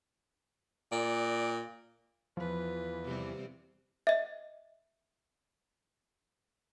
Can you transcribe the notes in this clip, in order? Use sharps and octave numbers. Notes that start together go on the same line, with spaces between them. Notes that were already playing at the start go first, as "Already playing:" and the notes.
A#2 D5
E2 F3 F4 B4
C3 G3 C4
D#5 E5